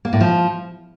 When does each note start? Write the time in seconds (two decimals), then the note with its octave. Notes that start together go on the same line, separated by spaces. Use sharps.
0.05 A#3
0.13 A2
0.21 F3